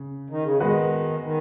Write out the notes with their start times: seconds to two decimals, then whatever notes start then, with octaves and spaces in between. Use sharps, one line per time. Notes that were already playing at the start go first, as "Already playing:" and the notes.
Already playing: C#3
0.30 D#3
0.44 C#3
0.57 D#3 G#3 B3 F#4 B4
1.22 D#3